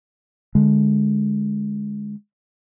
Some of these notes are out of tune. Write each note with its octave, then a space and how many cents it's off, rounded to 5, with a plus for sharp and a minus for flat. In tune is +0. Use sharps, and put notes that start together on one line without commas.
D3 +0 G#3 +0